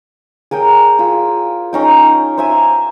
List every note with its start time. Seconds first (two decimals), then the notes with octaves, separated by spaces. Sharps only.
0.51 G#4 A#4 C#5 G5
0.99 F4 E6
1.73 C#4 D#4 G5
2.38 C5 E5 G#5 A#5